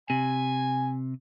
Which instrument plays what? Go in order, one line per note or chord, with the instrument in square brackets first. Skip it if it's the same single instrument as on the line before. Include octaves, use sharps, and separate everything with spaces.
[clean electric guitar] C3 [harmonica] G#5